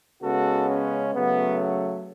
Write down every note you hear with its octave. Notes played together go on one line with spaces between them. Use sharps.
C#3 G#3 B3 F#4 A4
C#4
C#3 F#3 A3 B3